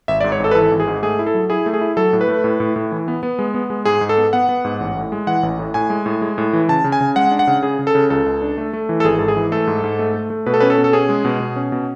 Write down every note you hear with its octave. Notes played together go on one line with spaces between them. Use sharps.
G#1 E5
D5
G#2
C#5
G#1 A4
B4
E3 A4
G#1
G#4
G#2
A3 G#4
E4
A4
F#3
E4 G#4
A3
G#4
E4
F#3 A4
A2
B4
A3
A2
A2
A2
E3
B3
B3
G#3
B3
G#3
G#2 G#4
G#2
A4
B3
B3 F#5
B3
G#2
A1
A2
G#3
E3 F#5
A1
A2
A2 G#5
G#3
A2
G#3
A2
E3
C#3 A5
C#3
G#5
C#3
G#3 F#5
D4
F#5
C#3
C#3 G#4
C#3
A4
C#3
C#2 A4
C#2
D4
A3
A3
E3
A4
G#1 G#4
G#2 A4
G#4
E3
A3 A4
G#2
G#2
A3
A3
A3
B2 B4
A4
C#4 B4
A4
B2
A4
C#4 G#4
G#3
B2
B2
C#4
B2